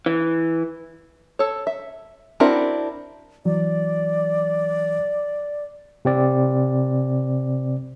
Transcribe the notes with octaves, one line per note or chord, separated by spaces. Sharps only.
E3
A4 C#5
E5
C4 D4 E4 F#4 A#4
E3 F#3 D5
C3 C4 D5